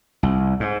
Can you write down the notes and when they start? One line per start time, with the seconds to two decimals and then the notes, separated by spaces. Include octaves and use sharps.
0.23 C2
0.60 G#2